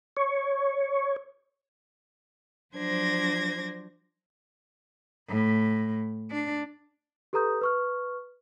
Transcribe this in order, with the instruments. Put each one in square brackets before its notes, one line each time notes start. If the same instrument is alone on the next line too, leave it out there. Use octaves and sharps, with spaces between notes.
[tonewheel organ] C#5
[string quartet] F3 F#3 D4 C5 G#6 A#6
[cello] A2
D4
[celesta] G4 A4 B4 A#5 D#6 G6
B4 C#6 F6